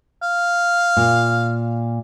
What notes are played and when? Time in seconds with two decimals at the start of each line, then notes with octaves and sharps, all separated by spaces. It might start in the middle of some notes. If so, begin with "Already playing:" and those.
0.23 F5
0.97 A#2